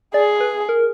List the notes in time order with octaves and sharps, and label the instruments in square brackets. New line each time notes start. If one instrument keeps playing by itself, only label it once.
[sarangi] G#4 [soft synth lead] D5
[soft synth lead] B4
A#4